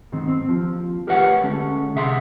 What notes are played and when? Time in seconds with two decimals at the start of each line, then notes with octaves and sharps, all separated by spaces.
0.12 G#2 D#3 C4
0.28 C4
0.48 D#2 F3
1.07 G4 A#4 B4 C#5 E5 F#5
1.43 D2 G#3 C#4 A4
1.95 C2 C3 G#4 E5 F#5 C6